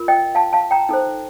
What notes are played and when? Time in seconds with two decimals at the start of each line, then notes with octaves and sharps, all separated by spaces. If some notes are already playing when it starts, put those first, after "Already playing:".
Already playing: F4 A#4
0.08 D#5 G5
0.35 F5 A5
0.53 F5 A5
0.71 G5 A#5
0.89 D#4 A4 C5